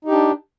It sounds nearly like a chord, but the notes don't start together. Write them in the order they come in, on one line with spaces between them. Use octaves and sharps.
D#4 G4 D4